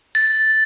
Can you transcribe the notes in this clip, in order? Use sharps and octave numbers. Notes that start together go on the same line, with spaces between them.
A6